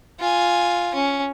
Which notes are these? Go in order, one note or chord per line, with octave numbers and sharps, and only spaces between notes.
F4 G#5
C#4